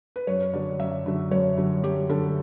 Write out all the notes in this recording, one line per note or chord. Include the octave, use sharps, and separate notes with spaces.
B4
F#2 C#5
D3 F#3 D5
F#2 E5
D3 F#3
F#2 C#5
D3 F#3
F#2 G4
D3 F#3 A4